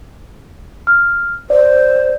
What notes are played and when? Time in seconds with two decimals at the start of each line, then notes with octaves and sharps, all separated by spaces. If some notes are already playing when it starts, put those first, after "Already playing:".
0.87 F6
1.50 C5 D5